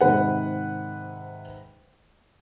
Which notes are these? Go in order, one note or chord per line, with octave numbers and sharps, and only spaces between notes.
G#2 C3 D#3 B4 F#5